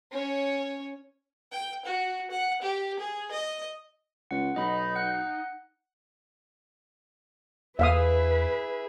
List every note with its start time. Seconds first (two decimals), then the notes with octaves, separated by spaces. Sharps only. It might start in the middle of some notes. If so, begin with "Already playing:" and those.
0.12 C#4 C#5
1.52 G5
1.85 F#4
2.31 F#5
2.62 G4
2.99 G#4
3.31 D#5
4.31 C#2 F#5
4.56 B1 D#4 D#5 B5
4.95 F#5 F#6
7.79 E2 E4 G#4 B4 E5 F5 D#6